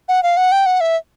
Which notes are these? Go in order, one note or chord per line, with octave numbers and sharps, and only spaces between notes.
F#5
F5
F#5
G5
F#5
E5